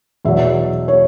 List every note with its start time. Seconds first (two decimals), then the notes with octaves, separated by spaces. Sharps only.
0.25 E2 B2 F#3 E5
0.88 C#5